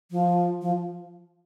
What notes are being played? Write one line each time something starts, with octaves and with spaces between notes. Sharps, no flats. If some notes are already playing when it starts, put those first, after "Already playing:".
F3
F3